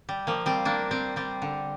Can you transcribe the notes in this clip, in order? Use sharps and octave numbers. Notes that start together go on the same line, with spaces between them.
G3
F3 A#3
G3 C4
A#3 D4
G3 C4
G3 C4
D3